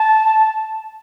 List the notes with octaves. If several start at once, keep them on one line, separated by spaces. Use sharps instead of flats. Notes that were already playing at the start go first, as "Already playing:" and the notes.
Already playing: A5